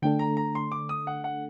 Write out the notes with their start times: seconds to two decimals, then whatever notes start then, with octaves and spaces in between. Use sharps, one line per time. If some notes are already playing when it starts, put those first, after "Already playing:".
0.02 D3 A3 D4 A4 G5
0.19 A#5
0.37 A#5
0.55 C6
0.72 D6
0.89 D#6
1.07 F#5
1.24 F#5